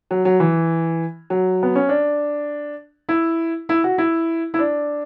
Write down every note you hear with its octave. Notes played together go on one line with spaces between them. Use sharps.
F#3
F#3
E3
F#3
B3
C#4
D4
E4
E4
F#4
E4
E4
D4